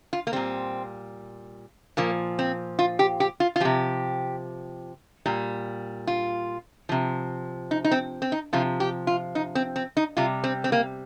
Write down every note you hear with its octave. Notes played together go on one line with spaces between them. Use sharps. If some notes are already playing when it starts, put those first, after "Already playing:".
F4
A#3
A#2 G3 C4
A#2 F3 A#3
C4
F4
G4
G4
F4
F4
C3 F3 G4
A#2 G3
F4
C3 F3
D#4
D#4
C4
C4
D#4
C3 F3 F4
G4
F4
D#4
C4
C4
D#4
C3 G3 F4
C4
C4
A#3